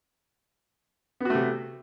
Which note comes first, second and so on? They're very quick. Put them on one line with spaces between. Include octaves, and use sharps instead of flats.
B3 F#4 A3 C3